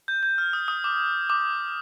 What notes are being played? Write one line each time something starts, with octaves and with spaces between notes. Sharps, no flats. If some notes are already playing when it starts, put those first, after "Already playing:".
G6
G6
F6
D#6
D#6
D6
D6